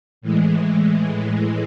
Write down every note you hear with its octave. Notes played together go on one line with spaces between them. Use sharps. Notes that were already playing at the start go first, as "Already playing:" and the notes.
A2 E3 G#3